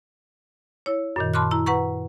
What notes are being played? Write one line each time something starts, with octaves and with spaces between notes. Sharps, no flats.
E4 C#5
F#2 A#2 D#3
A5 B5 C6 D6 F6 F#6
E4 A#5
B4 F#5 A#5 C#6